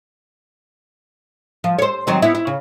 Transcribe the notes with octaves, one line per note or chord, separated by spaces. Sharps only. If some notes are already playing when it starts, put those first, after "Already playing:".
F3
C5 C#5
D#3 F#3 C4
B3 E4
E4
C#3